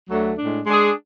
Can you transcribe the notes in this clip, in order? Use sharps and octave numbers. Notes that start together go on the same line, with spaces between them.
D2 D3 F#3 A3
A2 G#3 D4
G#3 D4 G#4